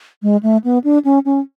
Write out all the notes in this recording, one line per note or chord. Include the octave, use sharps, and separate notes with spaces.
G#3
A3
B3
D4
C#4
C#4